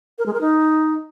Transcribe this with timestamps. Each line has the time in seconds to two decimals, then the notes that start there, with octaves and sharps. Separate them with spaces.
0.19 A#4
0.26 G#3
0.33 A#4
0.41 D#4